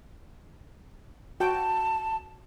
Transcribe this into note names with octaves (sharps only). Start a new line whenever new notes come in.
F#4 G5 A5